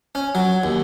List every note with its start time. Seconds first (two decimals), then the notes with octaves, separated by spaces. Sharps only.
0.15 C#4
0.35 F#3
0.64 D#2